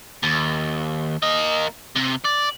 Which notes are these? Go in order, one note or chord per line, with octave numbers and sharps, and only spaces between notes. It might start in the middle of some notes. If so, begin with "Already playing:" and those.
D#2
A#3 D#5
C3
D5